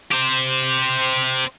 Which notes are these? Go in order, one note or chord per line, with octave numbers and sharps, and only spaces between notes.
G4 C5